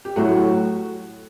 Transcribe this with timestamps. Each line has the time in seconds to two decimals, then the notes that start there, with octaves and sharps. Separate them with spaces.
0.05 G4
0.16 A2 F#3 A3 F#4